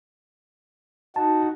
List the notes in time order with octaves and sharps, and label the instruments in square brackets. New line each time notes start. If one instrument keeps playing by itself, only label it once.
[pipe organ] D#4 F#4 [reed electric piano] A5